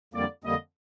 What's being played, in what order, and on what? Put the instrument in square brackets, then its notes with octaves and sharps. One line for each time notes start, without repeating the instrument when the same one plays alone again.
[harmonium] F2 D3 G3 A#3 [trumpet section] D5
[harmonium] F2 D3 G3 A#3 [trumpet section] D#5